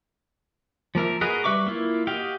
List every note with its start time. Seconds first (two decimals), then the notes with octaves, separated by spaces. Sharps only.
0.95 F3 A#3 A#4 E5
1.21 F#4 G#4 A#4 B4 D#5
1.44 G3 B4 E5 C#6 D6
1.67 A#3 E4 F4
2.07 F#4 G4 D#5 F5 G5